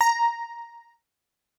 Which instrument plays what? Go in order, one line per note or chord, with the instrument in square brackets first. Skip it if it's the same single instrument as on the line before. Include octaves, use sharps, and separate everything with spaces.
[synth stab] A#5